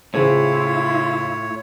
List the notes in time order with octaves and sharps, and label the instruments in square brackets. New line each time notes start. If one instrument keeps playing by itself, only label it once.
[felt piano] C#2 G#4 C5 [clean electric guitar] A2 [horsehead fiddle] E4 F4 [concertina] C#5